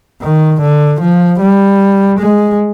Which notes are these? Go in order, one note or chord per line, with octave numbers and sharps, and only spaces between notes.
D#3
D3
F3
G3
G#3